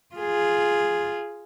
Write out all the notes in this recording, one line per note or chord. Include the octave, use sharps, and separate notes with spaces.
F4 G#4